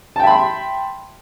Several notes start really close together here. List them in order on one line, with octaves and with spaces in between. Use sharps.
A5 G5 E5 B5 C6